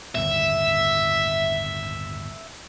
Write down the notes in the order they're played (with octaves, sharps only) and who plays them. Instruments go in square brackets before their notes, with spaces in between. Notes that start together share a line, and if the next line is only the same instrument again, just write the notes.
[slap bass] G1 D#2 A2 [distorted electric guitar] E5